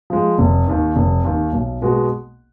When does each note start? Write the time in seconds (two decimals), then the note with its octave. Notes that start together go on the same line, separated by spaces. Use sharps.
0.10 F3 G#3
0.38 F1
0.68 D#2 D#3
0.96 F1
1.25 D#2 D#3
1.53 B1
1.82 B2 G#3 B3 F#4